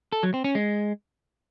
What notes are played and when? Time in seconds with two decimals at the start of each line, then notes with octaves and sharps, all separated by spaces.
0.12 A4
0.23 F#3
0.34 C4
0.44 C#4
0.55 G#3